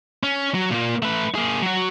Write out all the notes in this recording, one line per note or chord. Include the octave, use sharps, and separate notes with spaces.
C#4
F#3
A#2 A#3
A3 B4
A#3 G#4
F#3 F#4